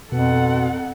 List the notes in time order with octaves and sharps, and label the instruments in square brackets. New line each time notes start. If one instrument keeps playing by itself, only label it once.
[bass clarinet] F2 [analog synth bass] B2 [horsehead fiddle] A4 F#5